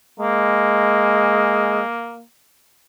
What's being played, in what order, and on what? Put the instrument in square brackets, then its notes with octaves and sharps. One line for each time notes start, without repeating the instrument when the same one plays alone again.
[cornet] G#3 [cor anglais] A#3